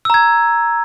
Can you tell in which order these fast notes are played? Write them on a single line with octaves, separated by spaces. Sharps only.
E6 A#5 G#6